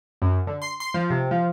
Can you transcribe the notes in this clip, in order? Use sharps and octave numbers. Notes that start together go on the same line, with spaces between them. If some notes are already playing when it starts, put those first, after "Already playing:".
F#2
D3
C6
C6
F3
C3
F3